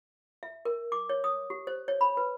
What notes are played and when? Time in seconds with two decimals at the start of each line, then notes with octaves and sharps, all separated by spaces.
0.43 E5
0.65 A#4
0.92 D6
1.09 C#5
1.24 D#6
1.50 G4
1.67 C5
1.88 C#5
2.01 B5
2.17 B4